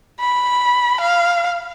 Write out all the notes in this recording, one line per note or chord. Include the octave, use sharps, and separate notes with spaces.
B5
F5